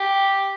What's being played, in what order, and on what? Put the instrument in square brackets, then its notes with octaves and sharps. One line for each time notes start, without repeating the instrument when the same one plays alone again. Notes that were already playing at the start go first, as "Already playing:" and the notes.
Already playing: [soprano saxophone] G4